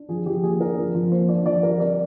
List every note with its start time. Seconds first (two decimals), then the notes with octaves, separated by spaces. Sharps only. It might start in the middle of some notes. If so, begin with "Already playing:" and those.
Already playing: D4
0.09 F3 G#4
0.26 F3 G4
0.43 A#3 G#4
0.60 D4 A#4
0.77 F3
0.95 F3
1.12 A#3 C5
1.29 D4 D5
1.46 F3 D5
1.63 G3 A#4
1.80 C4 D5